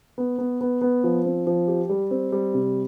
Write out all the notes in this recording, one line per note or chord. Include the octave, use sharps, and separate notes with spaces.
B3
B3
B3
B3
F3
C4
F3
G4
G3
C4
G3
C3